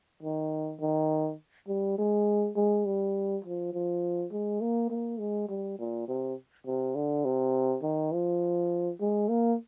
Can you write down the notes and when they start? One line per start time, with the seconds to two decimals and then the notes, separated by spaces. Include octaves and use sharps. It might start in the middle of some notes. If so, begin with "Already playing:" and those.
0.23 D#3
0.80 D#3
1.68 G3
1.98 G#3
2.56 G#3
2.85 G3
3.44 F3
3.73 F3
4.32 G#3
4.61 A#3
4.90 A#3
5.19 G#3
5.49 G3
5.78 A#2
6.08 C3
6.66 C3
6.95 D3
7.25 C3
7.83 D#3
8.12 F3
9.01 G#3
9.29 A#3